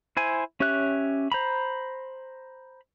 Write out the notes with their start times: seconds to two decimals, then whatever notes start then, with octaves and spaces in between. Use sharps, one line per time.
0.17 E4 C5 G#5
0.60 C#4 G4 C#5 E5 F#6
1.32 C5 A#5 B5